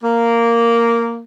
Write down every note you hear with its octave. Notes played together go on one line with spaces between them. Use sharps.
A#3